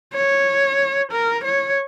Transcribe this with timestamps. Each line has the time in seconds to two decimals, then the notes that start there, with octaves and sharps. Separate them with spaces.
0.14 C#5
1.12 A#4
1.44 C#5